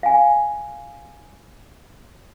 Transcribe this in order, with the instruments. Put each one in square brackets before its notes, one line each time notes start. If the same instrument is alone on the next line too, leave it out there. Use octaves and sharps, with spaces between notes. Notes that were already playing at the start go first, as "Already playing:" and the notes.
[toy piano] F5 G#5